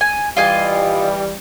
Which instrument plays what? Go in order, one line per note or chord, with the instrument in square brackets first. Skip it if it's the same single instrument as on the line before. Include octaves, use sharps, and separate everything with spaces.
[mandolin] G#5
[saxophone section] E3 G3 [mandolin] F4 D#5 G#5